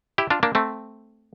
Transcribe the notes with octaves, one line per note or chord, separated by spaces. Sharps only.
E4 G4
D4 F4
A#3 D4
A3 C4